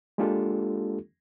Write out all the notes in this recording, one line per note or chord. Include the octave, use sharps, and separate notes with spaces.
G#3 A#3 D4 F4 G4 A4